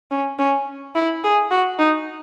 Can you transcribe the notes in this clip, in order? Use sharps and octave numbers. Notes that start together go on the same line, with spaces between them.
C#4
C#4
E4
G#4
F#4
D#4